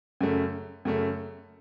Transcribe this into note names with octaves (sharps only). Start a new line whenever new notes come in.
F#2 C#3 A3
F#2 C#3 A3